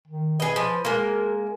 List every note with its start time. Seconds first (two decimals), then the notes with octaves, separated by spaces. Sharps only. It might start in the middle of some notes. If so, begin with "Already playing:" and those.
0.08 D#3
0.40 G#4 B4 D#5
0.56 F3
0.85 G#3 A#3 A#4